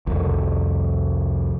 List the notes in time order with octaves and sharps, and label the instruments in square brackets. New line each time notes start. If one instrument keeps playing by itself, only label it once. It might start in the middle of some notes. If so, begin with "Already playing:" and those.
[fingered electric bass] C2 F2